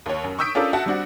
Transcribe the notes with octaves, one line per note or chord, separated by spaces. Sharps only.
D#2 C#5
F#2
C#6 D#6 E6 G6 B6 D7
C#4 D4 F4 A4 A#4 D5
F#4 E5 F#5 A5
G3 C4 D4 F#4 F#5